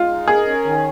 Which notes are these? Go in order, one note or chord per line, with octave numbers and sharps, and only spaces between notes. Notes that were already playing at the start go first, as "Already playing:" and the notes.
Already playing: G#3 F4
D#4
G#4 A#4
C#4
D#3